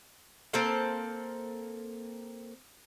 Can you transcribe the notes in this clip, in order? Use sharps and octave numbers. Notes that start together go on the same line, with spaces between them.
A#3 C4 A4 F5